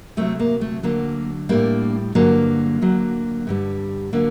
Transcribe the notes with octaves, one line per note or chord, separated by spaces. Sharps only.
D2 C3 F#3 A3 C4
A#3
A3
D2 D3 F#3 A#3
A2 G3 A#3 D4
G2 D3 F#3 A#3
D2 D3 F#3
G2 D3 G3
D3 F#3 A#3